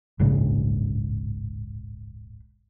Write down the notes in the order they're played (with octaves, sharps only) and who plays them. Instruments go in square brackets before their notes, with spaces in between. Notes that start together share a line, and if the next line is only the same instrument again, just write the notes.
[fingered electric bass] D1 A#1 G#2 C#3